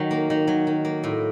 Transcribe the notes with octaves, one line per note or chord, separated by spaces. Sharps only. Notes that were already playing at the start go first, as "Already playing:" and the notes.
Already playing: D#3 F#3
A#3
D#3
F#3
D#3
A#3
A2